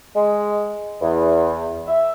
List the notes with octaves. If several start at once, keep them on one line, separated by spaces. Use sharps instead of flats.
G#3
E2
E5